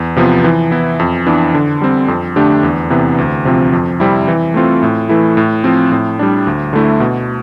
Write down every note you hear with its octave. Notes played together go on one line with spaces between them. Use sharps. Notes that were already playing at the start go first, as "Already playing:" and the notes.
Already playing: E2
C3 F3 B3
E3
B3 E4
F2
E3 B3 D4
D3
G3 C4
F2
D3 A3 D4 G4
E2
C3 E3 B3
D2
C3 F3 C4
F2
C3 G3 C4 E4
E3
A3 C4 F4 A4
A2
E3 A3 E4
A2
F3 C4 F4
A2
G3 D4
D2
D3 A3 E4
B2